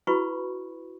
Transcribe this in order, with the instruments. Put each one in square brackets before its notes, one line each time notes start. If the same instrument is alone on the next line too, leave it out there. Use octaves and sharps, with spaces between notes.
[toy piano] E4 F#4 G#4 B4 B5 C#6